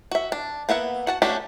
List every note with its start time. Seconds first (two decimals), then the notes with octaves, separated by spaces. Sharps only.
0.11 F#4 E5
0.32 D4
0.69 A#3 B3 E5 F#5
1.07 F#4 F#5 A5
1.22 A3 C#4 D4 F#4 G4